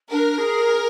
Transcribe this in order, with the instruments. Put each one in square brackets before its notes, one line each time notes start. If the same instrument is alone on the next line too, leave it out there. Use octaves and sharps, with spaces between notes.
[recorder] D4 [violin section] A#4
[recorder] G#4
G#4